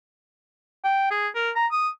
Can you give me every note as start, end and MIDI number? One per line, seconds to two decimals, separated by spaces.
0.85 1.09 79
1.11 1.29 68
1.35 1.51 70
1.56 1.67 82
1.72 1.89 87